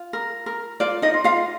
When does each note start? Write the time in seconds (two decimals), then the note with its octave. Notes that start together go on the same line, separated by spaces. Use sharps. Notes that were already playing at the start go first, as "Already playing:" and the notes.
Already playing: F4
0.13 A#4
0.46 A#4
0.80 F4 D5
1.02 D#4 D#5
1.14 F4
1.24 F4 F5